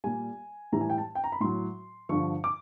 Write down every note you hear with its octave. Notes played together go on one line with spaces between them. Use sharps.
A#2 G3 G#5
A2 E3 G3 A#5
G#5
G5
A5
G5
A#5
B5
A2 F#3 C6
G2 D3 F3 C#6
D6